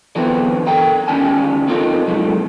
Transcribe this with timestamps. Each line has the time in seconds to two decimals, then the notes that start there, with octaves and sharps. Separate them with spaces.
0.15 D3 E3 F#3 B3 C4 E4
0.67 A4 A#4 G5 A#5
1.08 D2 D#3 G3 C#4 G#5 A5
1.68 C4 D#4 F4 A4 A#4
2.08 A2 C3 F#3 G#3 A3